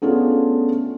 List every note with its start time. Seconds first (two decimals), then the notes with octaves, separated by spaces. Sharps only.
0.02 A3 B3 C#4 D4 F4 G#4